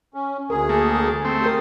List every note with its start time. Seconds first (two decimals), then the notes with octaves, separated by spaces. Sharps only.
0.14 C#4
0.50 D2 G#4 A#4
0.69 A3 A#3
1.25 A3 C4
1.41 G4 A#4 G5 D#6